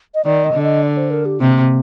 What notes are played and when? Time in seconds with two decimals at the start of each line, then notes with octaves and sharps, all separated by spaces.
0.15 D#5
0.25 D#3 D5
0.44 D#5
0.53 D3
0.63 D#5
0.83 D5
0.97 C5
1.11 A#4
1.26 G4
1.40 C3 A#3